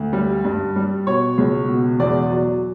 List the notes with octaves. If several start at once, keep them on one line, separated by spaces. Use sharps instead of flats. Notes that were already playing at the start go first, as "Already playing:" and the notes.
Already playing: D2
G3
G2
G3
B2 C#5
C#2
B2
E2 D5
F#3